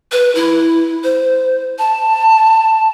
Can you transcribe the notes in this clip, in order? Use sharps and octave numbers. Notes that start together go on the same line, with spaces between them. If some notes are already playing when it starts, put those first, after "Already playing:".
B4
E4
C5
A5